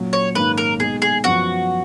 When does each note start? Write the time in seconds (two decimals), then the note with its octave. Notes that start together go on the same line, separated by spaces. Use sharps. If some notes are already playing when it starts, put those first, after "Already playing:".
Already playing: A#2 F#3 C#4
0.13 C#5
0.35 G#2 D#3 A#3 C#4 B4
0.58 A#4
0.80 B2 G#3 D#4 G#4
1.02 G#4
1.24 F#2 F3 B3 F#4